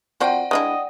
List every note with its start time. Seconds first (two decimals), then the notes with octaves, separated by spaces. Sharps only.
0.20 F3 C4 F#4 D5 F#5 G5
0.51 G#3 D4 E4 D#5